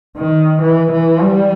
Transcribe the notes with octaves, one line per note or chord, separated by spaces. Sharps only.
D#3
E3
E3
G3